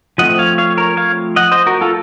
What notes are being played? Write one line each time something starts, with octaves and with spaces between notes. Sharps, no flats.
F3 A3 C4 D#5 F#5
C#5 F5
C#5 F5
A#4 C#5
C#5 F5
D#5 F#5
C5 D#5
F#4 A#4
F4 A4